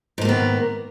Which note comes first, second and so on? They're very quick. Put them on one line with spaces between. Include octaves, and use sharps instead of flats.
G#2 A#3 D#3 B3